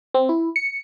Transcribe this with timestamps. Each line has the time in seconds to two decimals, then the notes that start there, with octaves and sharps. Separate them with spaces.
0.14 C4
0.29 E4
0.56 C#7